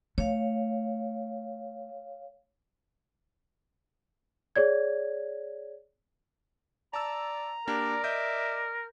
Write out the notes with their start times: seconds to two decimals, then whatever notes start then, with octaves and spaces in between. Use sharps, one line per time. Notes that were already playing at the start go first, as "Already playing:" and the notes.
0.18 A3 C#5 F5
4.56 G#4 C#5 D5 G#6
6.93 D5 A5 A#5 E6
7.67 A#3 D4 G4 A#4 D5
8.04 D#5 E5 D6 G6